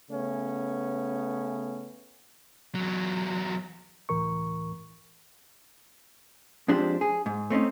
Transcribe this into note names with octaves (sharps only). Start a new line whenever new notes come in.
C#3 A3 B3 C#4
E2 F#3
C#2 A2 E3 A#4 C#6
F2 G#3 D4 G4 C5
G#4
G#2
A3 C4 C#4 D#4